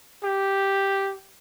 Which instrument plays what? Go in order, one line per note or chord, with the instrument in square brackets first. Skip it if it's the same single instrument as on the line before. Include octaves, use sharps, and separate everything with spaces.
[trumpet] G4